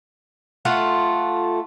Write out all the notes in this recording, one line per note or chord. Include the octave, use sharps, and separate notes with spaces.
A3 F4 F#5